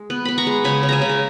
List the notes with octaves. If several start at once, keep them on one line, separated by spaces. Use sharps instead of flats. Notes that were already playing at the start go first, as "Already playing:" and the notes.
Already playing: G#3
B3
B3 B5
A#5 C#6
G#3
C#3 G#5 B5
C#3
E5 G#5 A#5
C#3
G#5